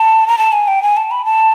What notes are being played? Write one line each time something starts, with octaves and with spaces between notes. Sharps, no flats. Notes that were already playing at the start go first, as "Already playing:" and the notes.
Already playing: A5
A#5
A5
G#5
G5
G#5
A5
B5
A5